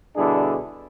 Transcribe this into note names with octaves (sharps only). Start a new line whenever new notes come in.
B2 D3 G3 D4 E4 G#4